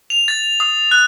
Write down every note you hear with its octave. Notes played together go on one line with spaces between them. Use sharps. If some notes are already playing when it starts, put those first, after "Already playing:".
F7
A6
D#6
F#6